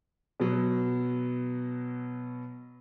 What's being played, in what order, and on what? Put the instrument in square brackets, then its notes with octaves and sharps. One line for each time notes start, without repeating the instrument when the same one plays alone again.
[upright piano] B2 F#3